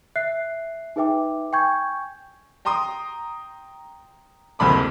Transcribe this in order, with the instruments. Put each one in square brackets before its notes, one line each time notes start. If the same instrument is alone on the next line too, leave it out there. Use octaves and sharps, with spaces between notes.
[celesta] E5 F#6 C7
D#4 G#4 B4 E5 G5 D6
G5 G#5 C#6 G6 G#6
[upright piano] G5 A#5 C6 D#6
F#1 D2 C3 B5 C6 D6